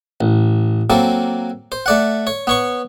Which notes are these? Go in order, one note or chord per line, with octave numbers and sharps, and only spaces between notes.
A1
F#3 A#3 C4 A4
C5
A3 D5 F#5
C#5
B3 C#5 C#6